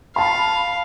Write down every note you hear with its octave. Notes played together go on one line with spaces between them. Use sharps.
F5 A5 B5